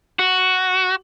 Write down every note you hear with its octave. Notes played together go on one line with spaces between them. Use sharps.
F#4